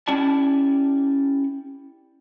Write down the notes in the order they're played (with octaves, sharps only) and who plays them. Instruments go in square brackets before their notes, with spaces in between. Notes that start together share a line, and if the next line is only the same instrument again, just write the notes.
[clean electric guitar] C#4 E4 G4 D5 A5